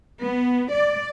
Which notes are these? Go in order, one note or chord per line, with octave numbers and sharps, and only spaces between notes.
B3
D5